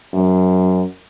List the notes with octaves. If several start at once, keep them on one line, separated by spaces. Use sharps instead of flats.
F#2